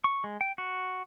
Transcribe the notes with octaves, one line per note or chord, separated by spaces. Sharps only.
C#6
G#3
G5
F#4